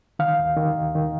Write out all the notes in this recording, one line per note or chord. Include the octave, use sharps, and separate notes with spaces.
D#3 F5
D#2
D#3
D#2
D#3